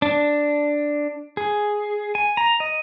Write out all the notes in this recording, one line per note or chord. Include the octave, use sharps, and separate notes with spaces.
D4
G#4
G#5
A#5
D#5